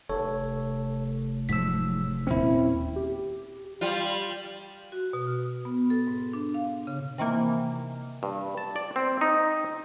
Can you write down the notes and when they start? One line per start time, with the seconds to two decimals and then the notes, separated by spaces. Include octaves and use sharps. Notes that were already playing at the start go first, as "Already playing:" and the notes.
0.09 F1 A4 C#5
1.49 G#2 F3 F#3 E6 B6
2.27 D#2 A#2 C4 C#4 E4
2.96 G4
3.81 G3 F4
4.92 F#4
5.13 B2
5.27 F6
5.65 B3
5.90 A4
6.07 G#2
6.33 D4
6.54 F5
6.87 C#3
7.18 C3 D#3 E3 A#3
8.23 G2
8.57 A5
8.76 D5
8.96 C4
9.21 D#4